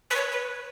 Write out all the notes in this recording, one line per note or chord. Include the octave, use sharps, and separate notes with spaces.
B4
C#5
B4